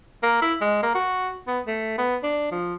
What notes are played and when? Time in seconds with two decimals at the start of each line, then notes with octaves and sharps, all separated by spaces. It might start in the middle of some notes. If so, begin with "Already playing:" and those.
0.23 A#3
0.42 E4
0.61 G#3
0.83 A#3
0.95 F#4
1.48 B3
1.67 A3
1.98 B3
2.23 D4
2.51 F3